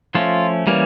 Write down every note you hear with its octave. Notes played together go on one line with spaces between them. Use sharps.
F3 A3 C#4 F4
E3 G3 A#3 C#4